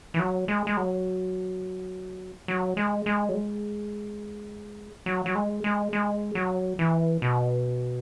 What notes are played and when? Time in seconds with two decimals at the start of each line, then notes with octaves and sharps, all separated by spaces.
0.14 E3
0.19 F#3
0.48 G#3
0.67 G#3
0.77 F#3
2.48 F#3
2.77 G#3
3.06 G#3
3.29 F#3
3.34 G#3
5.06 F#3
5.26 F#3
5.35 G#3
5.64 G#3
5.93 G#3
6.35 F#3
6.79 E3
7.22 B2